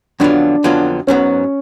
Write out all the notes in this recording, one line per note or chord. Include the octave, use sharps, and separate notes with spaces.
F2 D3 F#3 B3 D4 F4
F2 D3 F#3 B3 F4
G#2 F#3 B3 C#4